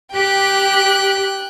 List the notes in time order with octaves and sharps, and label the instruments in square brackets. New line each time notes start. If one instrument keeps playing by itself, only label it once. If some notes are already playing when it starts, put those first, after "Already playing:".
[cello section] G4 [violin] G5 F#6